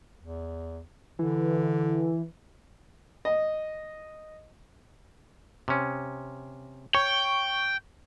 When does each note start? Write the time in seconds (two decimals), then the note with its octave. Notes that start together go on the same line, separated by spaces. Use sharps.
0.21 E2
1.19 D3 E3
3.25 D#5
5.68 C3 C#4
6.95 C#5 G5 C#6